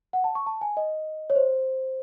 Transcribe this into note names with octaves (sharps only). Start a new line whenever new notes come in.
F#5
A5
C#6
A5
G#5
D#5
C#5
C5